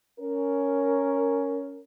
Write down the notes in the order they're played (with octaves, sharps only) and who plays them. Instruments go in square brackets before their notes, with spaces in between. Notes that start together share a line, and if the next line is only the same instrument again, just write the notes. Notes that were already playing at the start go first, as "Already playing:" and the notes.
[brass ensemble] C#4 A#4